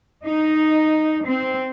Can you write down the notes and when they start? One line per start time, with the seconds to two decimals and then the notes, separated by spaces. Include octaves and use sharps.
0.25 D#4
1.26 C4